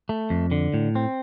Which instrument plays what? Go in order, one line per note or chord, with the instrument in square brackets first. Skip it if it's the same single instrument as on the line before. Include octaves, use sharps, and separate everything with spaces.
[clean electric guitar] A3
F2
D3
A2
C4